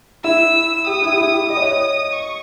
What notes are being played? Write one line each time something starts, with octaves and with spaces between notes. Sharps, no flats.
E4 E6
G4 D#6
E4
G4
E4
G4
D#5 D#6
C#5
D#5
C#6